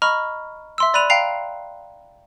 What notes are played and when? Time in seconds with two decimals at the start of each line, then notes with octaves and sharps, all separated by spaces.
0.02 D#5 A#5 B5 C#6 F6
0.78 E5 C6 E6
0.94 D5 B5 F#6 D#7 F7
1.10 F5 G5 A#5 C7 F7